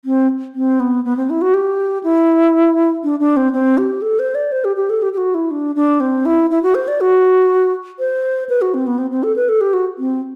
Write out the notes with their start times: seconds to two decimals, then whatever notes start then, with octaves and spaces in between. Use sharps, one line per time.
0.05 C4
0.55 C4
0.80 B3
1.05 B3
1.17 C4
1.30 E4
1.42 F#4
1.54 G4
2.04 E4
3.04 D4
3.20 D4
3.37 C4
3.53 C4
3.78 G4
4.02 A4
4.19 C5
4.35 D5
4.52 C5
4.65 G4
4.76 G4
4.90 A4
5.02 G4
5.13 G4
5.18 F#4
5.35 E4
5.51 D4
5.76 D4
6.00 C4
6.26 E4
6.50 E4
6.63 F#4
6.75 C5
6.88 D5
7.01 F#4
7.99 C5
8.49 B4
8.62 F#4
8.74 C4
8.87 B3
8.98 C4
9.11 C4
9.23 A4
9.36 B4
9.49 A4
9.61 G4
9.74 F#4
9.99 C4